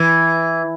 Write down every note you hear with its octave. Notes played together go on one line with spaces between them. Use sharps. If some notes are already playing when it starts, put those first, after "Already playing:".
Already playing: E3